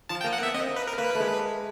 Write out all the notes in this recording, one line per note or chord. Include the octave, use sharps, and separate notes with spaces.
F3 A5
G5
A#3
F#5
B3 E5
C4 D#5
A#3
B4
A#4
A#3 B4
A3
G#3